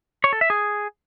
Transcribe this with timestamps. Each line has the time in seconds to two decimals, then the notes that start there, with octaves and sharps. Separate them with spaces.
0.24 C#5
0.33 A4
0.41 E5
0.50 G#4